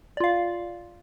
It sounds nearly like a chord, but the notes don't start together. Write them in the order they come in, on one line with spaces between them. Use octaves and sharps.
D5 F4 F5